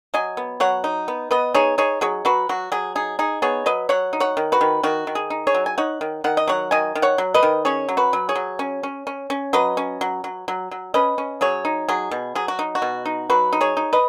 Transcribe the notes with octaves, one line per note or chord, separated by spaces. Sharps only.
F#3 D#5 G#5
B3
F#3 C#5 F#5
D#4
B3
B3 B4 D#5
D#4 G#4 C#5
D#4 G#4 C#5
F#3 G#4 C#5
F#3 F#4 B4
F#3 F#4
F#3 G#4
D#4 G#4
D#4 G#4
B3 G#4 C#5
F#3 B4 D#5
F#3 C#5 F#5
D#4
C#5 F#5
D#3
F#4 B4
D#3
D#3 F#4
D#3
G#4
D#4
G#4 C#5
F#3
G#5
D#4 C#5 F#5
D#3
D#3 F#5
D#5
F#3 C#5 F#5
D#3 D#5 G#5
D#3
C#5 F#5
F#3
B4 D#5
D#3
C#4 G#4 C#5
F#3
F#4 B4
F#3
G#4 C#5
F#3
C#4
C#4
C#4
C#4
F#3 B4 D#5
C#4
F#3
F#3
F#3
F#3
C#4 B4 D#5
C#4
F#3 G#4 C#5
D#4
F#3 G#4
B2
F#3 G#4
F#4
D#4
F#4
B2
D#4
F#3 F#4 B4
D#4
G#4 C#5
D#4
B4 D#5